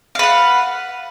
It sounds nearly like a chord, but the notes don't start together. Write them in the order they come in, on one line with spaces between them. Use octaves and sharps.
F5 B4 F#5